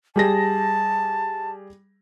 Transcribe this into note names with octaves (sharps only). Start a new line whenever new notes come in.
G3 G#4 A5 A#6